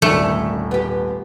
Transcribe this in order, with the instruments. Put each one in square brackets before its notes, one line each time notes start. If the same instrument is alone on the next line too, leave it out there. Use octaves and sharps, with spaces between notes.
[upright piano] D#1 G#1 [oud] D2 C#4 [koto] A3
[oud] B3 G4